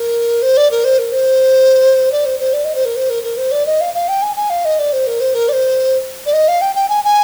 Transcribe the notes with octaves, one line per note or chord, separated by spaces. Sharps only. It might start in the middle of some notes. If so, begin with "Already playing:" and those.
Already playing: A#4
C5
D5
A#4
C5
A#4
C5
D5
C5
C5
D5
D#5
C5
A#4
C5
A#4
A#4
C5
D5
D#5
F5
F5
G5
G#5
G#5
F5
D#5
D5
C5
A#4
C5
A#4
D5
C5
D5
D#5
F5
G5
G5
G#5
G#5